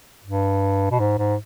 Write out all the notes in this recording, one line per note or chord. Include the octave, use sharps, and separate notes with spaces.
G2
B2
G#2
G#2